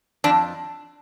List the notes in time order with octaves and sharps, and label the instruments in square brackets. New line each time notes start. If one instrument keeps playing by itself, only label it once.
[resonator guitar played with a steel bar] F2 D4